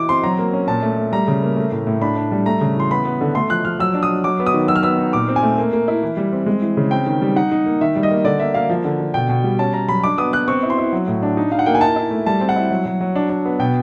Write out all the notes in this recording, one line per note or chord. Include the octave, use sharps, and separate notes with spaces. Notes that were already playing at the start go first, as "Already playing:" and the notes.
Already playing: E3 D6
C4 C6
F#3 A#5
A#3
C#4
A#2 A5
A3
A3
G3 A#5
C#3
A#3
A3
A2
A2
D4 B5
D4
G3
A3 A#5
C#3
E3 C6
B3 B5
B3
D3
A3 C6
F3 F#6
F3 F6
F#3 E6
D4
D#6
F#3
F#3 D6
B3
D#6
D#3
F#3 E6
F6
B3 E6
D#4
A#2 D6
C4
G#5
A3
A#3
A#3
E4
E3
G3
C4
G#3
E3
C#3
C4 G5
D#3
G3
D#4 F#5
D#4
A#3
D#3 E5
G3
D#5
A#3
D3 D5
A#3 E5
A#3 F5
F3
D3
D3
B2 G5
B2
G3
C#4 A5
C#4 A#5
F#3 B5
D4 D6
B3 D#6
B3 F#6
C4 C#6
E4
C6
E4
F#3
A2
D4
D#4
D#4 F5
F#5
A#3 G5
G#5
E4 A5
E4
A3
G3 A5
C4
F#5
E4
F#3
F#3
F#3
D4
D4
B3
B2 G5